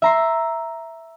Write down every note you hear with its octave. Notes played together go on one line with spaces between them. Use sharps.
E5 A#5 C6